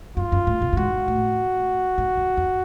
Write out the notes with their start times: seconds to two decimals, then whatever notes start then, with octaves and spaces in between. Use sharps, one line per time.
0.17 F#2 F4
0.32 F#2
0.47 A2
0.62 B2
0.73 A2
0.77 G#2 F#4
1.08 A2
1.98 G#2
2.17 F#2
2.37 F2